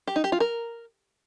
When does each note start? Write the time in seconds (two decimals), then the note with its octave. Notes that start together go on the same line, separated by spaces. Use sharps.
0.07 G4
0.16 D#4
0.24 G4
0.32 F4
0.40 A#4